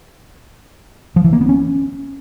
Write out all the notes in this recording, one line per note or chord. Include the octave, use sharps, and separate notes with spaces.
F3
E3
A#3
B3
C#4